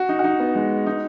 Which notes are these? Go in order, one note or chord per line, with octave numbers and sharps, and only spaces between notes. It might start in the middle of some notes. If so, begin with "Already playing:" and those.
Already playing: F#4
D#4
F#4
D#4
B3
G#3
D#4